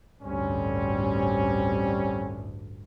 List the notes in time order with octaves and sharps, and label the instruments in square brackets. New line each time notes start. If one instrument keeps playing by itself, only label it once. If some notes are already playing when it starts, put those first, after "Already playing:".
[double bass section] A1 D2 G2 [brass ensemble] G3 C4 C#4